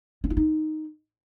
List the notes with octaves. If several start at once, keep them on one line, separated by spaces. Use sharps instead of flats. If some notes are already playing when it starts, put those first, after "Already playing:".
C#4
E4
D#4